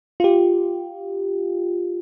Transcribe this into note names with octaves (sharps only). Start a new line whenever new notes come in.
F4 G4